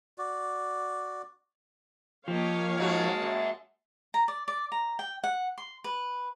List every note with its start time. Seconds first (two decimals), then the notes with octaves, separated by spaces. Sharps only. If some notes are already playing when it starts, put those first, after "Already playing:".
0.18 F#4 D5
2.28 F3 A#3 G4 C#5 D#5 F5
2.78 G#2 F#3 G#3 F#4 A5
3.22 F#2
4.14 A#5
4.28 D5
4.48 D5
4.72 A#5
4.99 G5
5.24 F#5
5.58 C6
5.84 B4